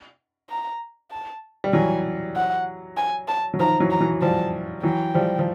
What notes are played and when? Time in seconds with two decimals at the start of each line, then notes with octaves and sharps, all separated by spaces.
0.49 A#5
1.11 A5
1.64 G3
1.73 E3 F#3 G#5
2.36 F#5
2.97 G#5
3.28 A5
3.54 F#3
3.60 D#3 F3 A#5
3.80 E3 F#3
3.91 A#5
4.01 E3 F#3
4.22 F3 G3 A5
4.83 E3 F#3 G5
5.15 F3 G3
5.39 F3